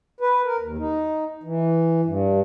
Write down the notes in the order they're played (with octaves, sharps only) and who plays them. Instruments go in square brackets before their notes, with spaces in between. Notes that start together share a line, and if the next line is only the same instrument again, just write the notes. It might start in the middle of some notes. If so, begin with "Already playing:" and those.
[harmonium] B4
A#4
D#2
D#4
E3
G2